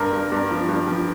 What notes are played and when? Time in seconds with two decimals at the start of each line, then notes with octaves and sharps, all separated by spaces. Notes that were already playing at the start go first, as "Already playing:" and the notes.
Already playing: G2 A#4
0.13 G2
0.32 G2
0.51 F3
0.69 G2
0.87 F3